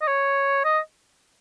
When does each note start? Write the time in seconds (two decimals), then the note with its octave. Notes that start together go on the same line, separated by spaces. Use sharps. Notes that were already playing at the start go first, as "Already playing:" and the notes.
0.01 D#5
0.07 C#5
0.64 D#5